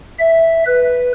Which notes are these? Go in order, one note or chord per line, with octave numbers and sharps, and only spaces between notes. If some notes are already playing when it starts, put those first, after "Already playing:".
E5
B4